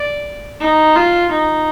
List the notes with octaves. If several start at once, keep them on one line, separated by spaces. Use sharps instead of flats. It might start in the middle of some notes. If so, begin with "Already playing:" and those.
Already playing: D5
D#4
F4
D#4